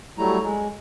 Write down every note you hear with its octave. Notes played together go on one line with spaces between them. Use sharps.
F#3 G3 A3 E4 A#5
G#3